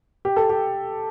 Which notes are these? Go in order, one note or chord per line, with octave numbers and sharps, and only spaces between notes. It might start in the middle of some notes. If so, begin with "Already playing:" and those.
G4
A4
G4